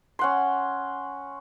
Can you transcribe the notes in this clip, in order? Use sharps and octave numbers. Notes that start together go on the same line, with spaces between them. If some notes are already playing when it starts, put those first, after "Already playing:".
C#4 F#5 C6